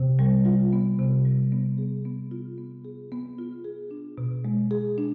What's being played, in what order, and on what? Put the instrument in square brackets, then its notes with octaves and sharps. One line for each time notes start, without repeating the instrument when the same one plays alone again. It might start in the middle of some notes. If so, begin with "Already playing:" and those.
Already playing: [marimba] C3 B3
G3
F4
B3
C3
G3
B3
G#4
B3
F4
B3
G#4
B3
F4
G#4
D4
B2
G#3
G#4
D4